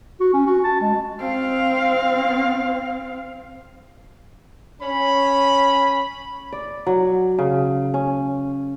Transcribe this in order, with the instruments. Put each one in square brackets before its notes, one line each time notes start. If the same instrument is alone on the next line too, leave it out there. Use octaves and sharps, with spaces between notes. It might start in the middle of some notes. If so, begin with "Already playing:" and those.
[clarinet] F#4
C#4
F#4
A5
G#3
[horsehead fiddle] C4 F5
[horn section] C#4 B5
[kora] D5
F#3
C#3
C#4